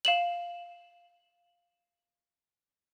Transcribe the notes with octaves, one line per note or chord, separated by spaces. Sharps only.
F5 E7 F#7